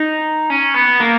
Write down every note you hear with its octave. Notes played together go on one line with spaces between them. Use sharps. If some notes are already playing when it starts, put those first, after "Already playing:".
Already playing: D#4
C#4
B3
A#3